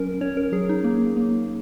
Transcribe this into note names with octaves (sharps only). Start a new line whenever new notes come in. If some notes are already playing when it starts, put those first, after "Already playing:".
Already playing: F#3 C#4 A#4
C#4 C#5
A#4
F#3 G#4
D#4
A#3
A#3